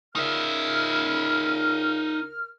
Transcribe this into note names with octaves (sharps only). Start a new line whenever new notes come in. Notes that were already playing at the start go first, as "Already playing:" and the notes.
C#2 D#4 A#4 E5 F6